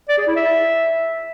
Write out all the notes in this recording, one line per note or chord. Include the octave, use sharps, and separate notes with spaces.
D5
G#4
E4
E5